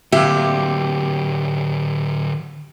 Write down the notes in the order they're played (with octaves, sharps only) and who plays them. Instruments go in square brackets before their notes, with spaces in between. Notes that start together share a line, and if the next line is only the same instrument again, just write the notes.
[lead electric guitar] D3 F#3 [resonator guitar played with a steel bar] A#3 C4 E5 [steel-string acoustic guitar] G4